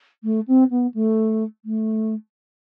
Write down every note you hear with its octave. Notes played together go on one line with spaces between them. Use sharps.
A3
C4
B3
A3
A3